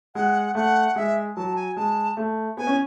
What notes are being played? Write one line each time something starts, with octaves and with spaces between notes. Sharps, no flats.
G#3 F#5
A3 F#5
G#3 E5
F#3 A5
G#5
G#3 A5
A3
B3 G#5
C#4